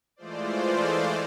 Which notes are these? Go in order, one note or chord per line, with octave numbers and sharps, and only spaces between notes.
E3 G#3 A3 F4 C5 D5